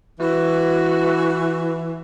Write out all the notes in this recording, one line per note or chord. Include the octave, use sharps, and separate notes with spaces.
E3 F#4